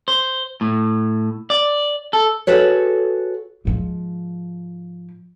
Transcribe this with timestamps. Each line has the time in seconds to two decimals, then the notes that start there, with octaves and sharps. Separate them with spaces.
0.08 C5
0.61 A2
1.50 D5
2.13 A4
2.47 F#4 G#4 A4 B4 C#5
3.65 G#2 F3